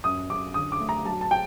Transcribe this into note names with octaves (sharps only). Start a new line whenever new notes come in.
F#2 D#6
F#2 D6
D3 D#6
D6
A3
A#5
F#3 A5
A5
G5